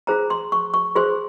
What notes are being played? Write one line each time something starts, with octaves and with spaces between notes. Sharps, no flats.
F4 G#4 C5 A#5
C6
C#6
C#6
F4 G#4 C5 C6